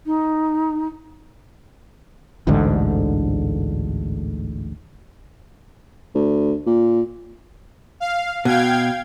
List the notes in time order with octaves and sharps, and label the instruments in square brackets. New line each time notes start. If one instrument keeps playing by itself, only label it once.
[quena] D#4
[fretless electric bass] A1 D2 G#2 D3
[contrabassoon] D2
A#2
[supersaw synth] F5
[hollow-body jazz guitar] B2 [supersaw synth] F5 G5 G#6